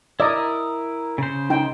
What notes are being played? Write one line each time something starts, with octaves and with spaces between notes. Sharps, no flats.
E4 A#4 D5 D#5 D#6
C#3 C5
D#4 G5